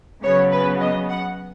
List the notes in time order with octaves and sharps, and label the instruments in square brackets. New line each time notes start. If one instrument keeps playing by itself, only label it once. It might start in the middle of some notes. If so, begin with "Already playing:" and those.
[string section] C#3 F#3 B3 C#5
B4
D#5
F#5